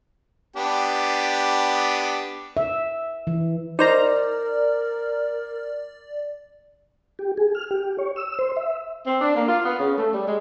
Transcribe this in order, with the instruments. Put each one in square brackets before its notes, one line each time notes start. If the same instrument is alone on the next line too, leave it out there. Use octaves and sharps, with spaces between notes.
[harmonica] B3 D4 G4
[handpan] E5
E3
[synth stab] D#4 C5 A#5 [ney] A#4 [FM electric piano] D5
[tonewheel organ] G4
G#4
F6
G4
C#5
E6
C5
E5
[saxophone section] C4
D4
A#3
F4
B3
C#3
A3
G3
G#3